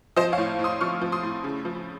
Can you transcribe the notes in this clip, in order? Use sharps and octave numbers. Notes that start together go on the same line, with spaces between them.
F3 C5 D#5
C#5 F5
A2
A2
C6 D#6
F3 C#6 F6
F3
C6 D#6
A2
C#3
F3